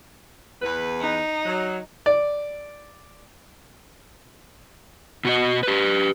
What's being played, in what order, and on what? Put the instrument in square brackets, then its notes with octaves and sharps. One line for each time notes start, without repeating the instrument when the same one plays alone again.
[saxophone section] E2 B4
[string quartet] D#4
[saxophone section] F#3
[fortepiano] D5
[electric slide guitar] B2 F#4 D#5
G4 B4